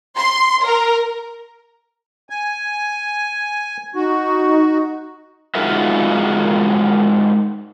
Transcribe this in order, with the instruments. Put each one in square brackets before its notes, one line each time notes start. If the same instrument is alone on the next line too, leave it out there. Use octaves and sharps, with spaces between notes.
[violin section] C6
A#4
[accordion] G#5
[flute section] D#4 [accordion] F#4
[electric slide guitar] G#3 D#4 F4 F#4 A#4 E5